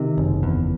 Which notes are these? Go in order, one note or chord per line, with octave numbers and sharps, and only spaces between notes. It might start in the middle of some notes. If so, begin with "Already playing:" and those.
Already playing: C3 D#3
F#1
E2